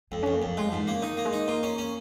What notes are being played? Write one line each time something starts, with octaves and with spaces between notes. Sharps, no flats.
F2 G#3
F2 C#4
A#3
F2 F3
G#3 F4
G#2 F3
D#3
C#3 A#3
D#3 D#4
A#3
G#3
D#4
A#3 F4
C#4
C#4